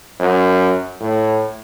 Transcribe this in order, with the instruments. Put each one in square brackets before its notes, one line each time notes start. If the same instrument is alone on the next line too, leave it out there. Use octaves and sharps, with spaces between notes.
[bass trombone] F#2
A2